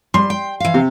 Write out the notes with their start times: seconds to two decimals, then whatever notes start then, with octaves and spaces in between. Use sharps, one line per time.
0.14 G3 C6
0.30 G5
0.60 E3 F5
0.74 C3